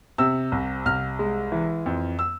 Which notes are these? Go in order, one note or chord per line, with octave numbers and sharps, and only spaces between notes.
C3 E6
C2
C2 F6
G#3
E3
F2
E6